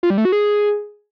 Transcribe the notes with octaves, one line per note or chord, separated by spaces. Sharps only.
F4
G3
A3
F#4
G#4